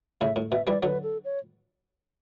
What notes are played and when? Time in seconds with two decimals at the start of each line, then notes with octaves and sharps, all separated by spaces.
0.21 A2 C#3 E5
0.36 A2
0.51 B2 E5
0.67 E3 G3 D5
0.83 D3 F#3 B4
1.03 A4
1.25 C#5